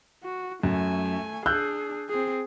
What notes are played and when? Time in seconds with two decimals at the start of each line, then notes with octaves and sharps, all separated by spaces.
0.24 F#4
0.63 F#2 A3 G#5
1.46 D4 G#4 E6 F#6 G6
2.09 C4 G#4